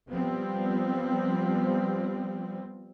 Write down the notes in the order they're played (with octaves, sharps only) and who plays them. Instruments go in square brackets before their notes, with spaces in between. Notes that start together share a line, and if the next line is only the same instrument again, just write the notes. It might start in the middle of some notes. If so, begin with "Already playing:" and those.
[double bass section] F3 G3 B3 C4